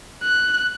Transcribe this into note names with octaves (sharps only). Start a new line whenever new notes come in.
F#6